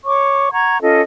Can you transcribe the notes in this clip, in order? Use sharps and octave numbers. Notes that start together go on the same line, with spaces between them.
C#5 C#6 D6
F#5 A#5 C#6 G#6
C#4 F4 A4 D#5